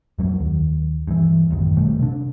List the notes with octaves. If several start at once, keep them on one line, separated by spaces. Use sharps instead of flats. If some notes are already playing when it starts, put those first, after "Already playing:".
F2 F#3 A3 A#3
D#2
G2 E3
A1 F#2 D3 D#3
B2 D#3 G3 A3
C3 D4